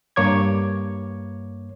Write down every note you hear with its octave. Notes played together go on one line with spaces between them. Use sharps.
G2 A#3 C#5 D6 G#6